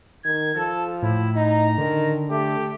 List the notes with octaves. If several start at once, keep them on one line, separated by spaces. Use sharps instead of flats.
D#3 G#6
F3 A4
A2 E4
D#4 A#5
D3 D#3
A3 G4